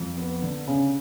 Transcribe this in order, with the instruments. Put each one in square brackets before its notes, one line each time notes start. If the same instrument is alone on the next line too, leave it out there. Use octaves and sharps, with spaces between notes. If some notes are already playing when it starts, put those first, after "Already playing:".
Already playing: [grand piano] F2
B3
D3
C#3